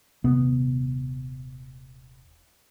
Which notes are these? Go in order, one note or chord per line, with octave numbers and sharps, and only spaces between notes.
D#1 C3 B3